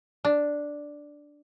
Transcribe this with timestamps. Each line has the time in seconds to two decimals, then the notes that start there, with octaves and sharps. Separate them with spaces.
0.25 D4